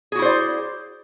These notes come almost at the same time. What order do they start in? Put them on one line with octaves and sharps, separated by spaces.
G#4 F#4 E4 C5 D5